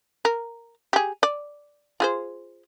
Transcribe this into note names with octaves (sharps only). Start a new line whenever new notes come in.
A#4
G4 G#4
D5
F4 G#4 C5